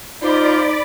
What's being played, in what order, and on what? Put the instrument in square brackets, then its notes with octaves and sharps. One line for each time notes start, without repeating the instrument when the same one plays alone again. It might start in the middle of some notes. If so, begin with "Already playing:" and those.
[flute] D#4 [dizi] F4 [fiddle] C5 [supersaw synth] D5 B5 D6